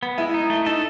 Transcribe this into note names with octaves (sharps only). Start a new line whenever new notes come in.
B3
G#3 E4
D#4
A3
D#4 A4